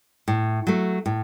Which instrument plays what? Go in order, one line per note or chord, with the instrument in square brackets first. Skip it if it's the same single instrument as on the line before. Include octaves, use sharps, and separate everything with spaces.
[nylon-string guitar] A2
F#3 A3
A2